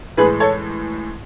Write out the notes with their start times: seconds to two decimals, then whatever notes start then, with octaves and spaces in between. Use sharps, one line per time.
0.17 A2 E3 G#3 G#4 B4
0.40 A4 C#5